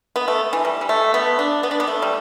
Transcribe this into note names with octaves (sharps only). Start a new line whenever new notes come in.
B3
A3
E3
G3
G3
A3
B3
D4
B3
D4
B3
A3
G3